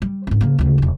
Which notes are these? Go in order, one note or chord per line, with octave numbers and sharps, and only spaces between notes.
G3
G#2 C4
C#3 A#3
D2 C#3
E1 A#1